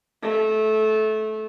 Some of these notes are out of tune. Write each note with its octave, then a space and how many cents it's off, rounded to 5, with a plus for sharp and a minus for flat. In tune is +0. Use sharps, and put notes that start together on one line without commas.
A3 -20